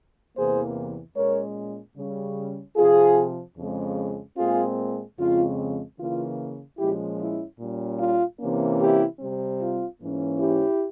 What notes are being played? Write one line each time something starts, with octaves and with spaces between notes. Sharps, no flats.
E2 C3 E3 A#3 G#4 C5
A#2 G#3 C#4 A#4 C#5
C#3 G3 C#4
C3 F3 C4 F4 G#4
F2 C#3 F3 G#3
A#2 G#3 C4 F4 G#4
F2 C#3 F3 G#3 C4 F4
C#3 E3 A#3 F4
A#2 F3 G#3 C#4 E4 G4
E4
A#2 G3 C#4
F4
C3 E3 A#3 C#4
E4 G4
C3 G3 C4
F4
G#2 E3 A#3 C#4
E4 G4